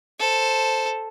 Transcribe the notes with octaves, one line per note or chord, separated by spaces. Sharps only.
A4 C5